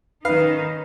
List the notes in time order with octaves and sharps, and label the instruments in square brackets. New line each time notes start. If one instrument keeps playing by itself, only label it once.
[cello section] D#3 C#4 D#4 [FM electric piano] B4 [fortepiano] F5